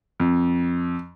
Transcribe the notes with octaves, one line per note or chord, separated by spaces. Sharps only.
F2